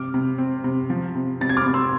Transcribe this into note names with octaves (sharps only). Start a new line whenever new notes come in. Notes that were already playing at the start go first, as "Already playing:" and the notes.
Already playing: C3 D6 F6
C3
C4
C3
F3
C3
C3 A6
G#6
D6 F6
C3
C6 E6